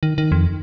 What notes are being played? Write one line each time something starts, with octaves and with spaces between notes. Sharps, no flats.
D#3
D#3
F2